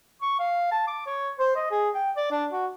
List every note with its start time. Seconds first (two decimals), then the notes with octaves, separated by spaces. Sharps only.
0.22 C#6
0.39 F5
0.72 A5
0.88 D6
1.06 C#5
1.39 C5
1.56 D#5
1.71 G#4
1.95 G5
2.16 D5
2.31 D4
2.51 F#4